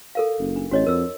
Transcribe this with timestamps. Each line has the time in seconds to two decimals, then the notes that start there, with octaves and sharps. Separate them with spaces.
0.15 A4 A#4 F5
0.39 F#1
0.56 D4
0.71 A1 F#4 C#5 D#5
0.87 F2 A#4 E6